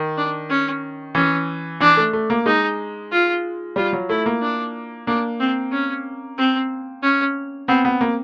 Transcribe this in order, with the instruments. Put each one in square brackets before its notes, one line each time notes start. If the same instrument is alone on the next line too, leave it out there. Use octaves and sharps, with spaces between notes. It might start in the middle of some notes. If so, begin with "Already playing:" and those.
Already playing: [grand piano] D#3
[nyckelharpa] D4
C#4
[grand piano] E3 [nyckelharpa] C#4
[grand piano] E3 [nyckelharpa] D4
[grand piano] A3
A3
A#3
[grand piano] G#3 [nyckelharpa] D#4
[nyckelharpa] F4
[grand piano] G3 [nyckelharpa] F4
[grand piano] F#3
[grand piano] A3 [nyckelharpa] E4
[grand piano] A#3
[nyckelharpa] D4
[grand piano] A#3 [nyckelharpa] D4
[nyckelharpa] C4
C#4
C4
C#4
[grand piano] B3 [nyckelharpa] C4
[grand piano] B3
A#3